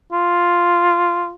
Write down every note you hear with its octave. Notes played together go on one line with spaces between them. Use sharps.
F4